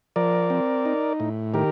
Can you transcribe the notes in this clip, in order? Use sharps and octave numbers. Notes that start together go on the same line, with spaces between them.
F3 A#4 D5
C4
D#4
A2
D#3 G4 A#4